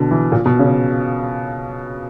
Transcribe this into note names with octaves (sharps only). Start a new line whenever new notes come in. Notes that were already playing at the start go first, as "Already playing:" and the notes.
Already playing: B2 D3
E3
A#2
B2
C#3